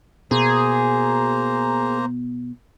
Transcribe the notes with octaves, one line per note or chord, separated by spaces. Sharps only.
B2 A#3 G#4 C5 A#5